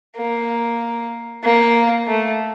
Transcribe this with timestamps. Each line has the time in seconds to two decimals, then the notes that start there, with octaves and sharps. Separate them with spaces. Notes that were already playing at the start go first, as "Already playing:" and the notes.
0.16 A#3
1.44 A#3
2.07 A3